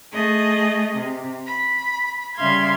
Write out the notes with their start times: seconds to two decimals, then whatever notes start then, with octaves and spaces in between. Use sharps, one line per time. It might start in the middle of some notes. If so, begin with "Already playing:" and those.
0.13 A3 G#4 D#5
0.97 C3
1.46 B5
2.36 C#3 G3 E5 F5 C6 G#6